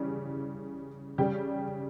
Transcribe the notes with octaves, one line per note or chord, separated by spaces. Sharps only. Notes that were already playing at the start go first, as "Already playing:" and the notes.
Already playing: C#3 E3 G3
C#3 G3 G4